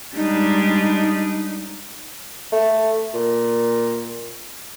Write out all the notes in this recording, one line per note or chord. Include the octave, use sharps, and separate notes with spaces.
G3 G#3 D4 D#4
A3
A#2